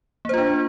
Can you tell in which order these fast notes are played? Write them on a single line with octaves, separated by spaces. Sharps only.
A#3 C5 F4 D4